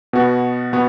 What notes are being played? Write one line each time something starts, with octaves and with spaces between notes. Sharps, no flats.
B2 B3 F#4
B2 B3 F#4